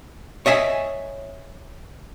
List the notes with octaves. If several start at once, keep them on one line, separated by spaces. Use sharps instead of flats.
C#5 D#5 E5 G#5